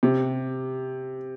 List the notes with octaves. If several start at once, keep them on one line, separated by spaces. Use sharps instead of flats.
C3